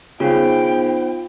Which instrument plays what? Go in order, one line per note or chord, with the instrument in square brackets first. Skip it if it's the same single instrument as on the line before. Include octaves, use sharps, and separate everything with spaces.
[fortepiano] C#3 [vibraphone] B3 D#4 C5 [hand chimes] F4 [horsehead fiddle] G5